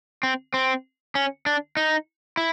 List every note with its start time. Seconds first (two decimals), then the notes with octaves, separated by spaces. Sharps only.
0.23 C4
0.54 C4
1.15 C#4
1.46 D4
1.77 D#4
2.37 E4